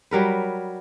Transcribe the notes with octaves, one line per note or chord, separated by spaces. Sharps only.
F#3 G3 A#4 B4